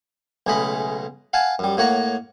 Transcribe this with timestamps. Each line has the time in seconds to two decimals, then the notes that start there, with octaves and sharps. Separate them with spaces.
0.47 B1 C#3 G#3 A3 D#5 B5
1.33 F5 F#5 G#5 A5
1.59 F#2 G3
1.77 A2 A#3 C#5 F#5 A#5